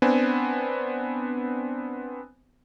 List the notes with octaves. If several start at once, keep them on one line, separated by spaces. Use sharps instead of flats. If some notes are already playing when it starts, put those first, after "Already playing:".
B3 C4 D4 G#5